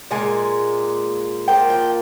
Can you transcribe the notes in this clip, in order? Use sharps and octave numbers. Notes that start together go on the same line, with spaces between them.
A#2 G#3 G#5
F3 A#3 G5
G5